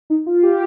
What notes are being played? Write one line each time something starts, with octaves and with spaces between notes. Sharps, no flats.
D#4
F4
G4